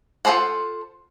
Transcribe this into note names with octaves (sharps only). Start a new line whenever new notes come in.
F4 G#4 A4 C5 F#5